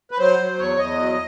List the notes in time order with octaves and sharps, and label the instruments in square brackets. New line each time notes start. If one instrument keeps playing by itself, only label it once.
[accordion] B4
F#3 C5
F#3
E2 C#5
E2 D#5
F#3